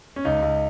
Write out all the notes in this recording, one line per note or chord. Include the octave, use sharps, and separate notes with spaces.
C#4
C#2 D#4
C#2